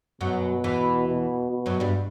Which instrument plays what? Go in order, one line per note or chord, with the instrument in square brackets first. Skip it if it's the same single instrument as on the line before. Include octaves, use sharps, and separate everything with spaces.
[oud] F#2 F#3 [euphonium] B2
[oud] E2 E3
[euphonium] B2
B2
[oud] F#2 F#3
G2 G3